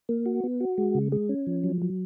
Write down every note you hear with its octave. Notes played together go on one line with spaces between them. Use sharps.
A#3
F#4
B3
F#4
G#3
C#3
G#3
C#4
F3
F#3
F#3